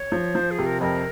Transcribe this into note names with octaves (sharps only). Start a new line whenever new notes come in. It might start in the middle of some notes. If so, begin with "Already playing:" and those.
Already playing: C#5
F3
F3 C5
G#4
C3
A#4
F2 A#4